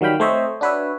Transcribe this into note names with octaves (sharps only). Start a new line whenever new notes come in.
D#3 F#3 G3 F5 G5 B5
A3 C4 C5 C#5 D#5 E5
D4 F#4 B4 C#5 E5